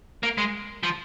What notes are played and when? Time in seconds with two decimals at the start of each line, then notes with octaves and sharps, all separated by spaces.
0.23 A#3
0.38 G#3
0.83 F3